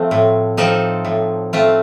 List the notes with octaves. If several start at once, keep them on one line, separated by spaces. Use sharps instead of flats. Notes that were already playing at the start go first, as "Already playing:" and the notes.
Already playing: F3 A3 C4
A2
F3 C4 D#4 A4
A2
A3 C4 F4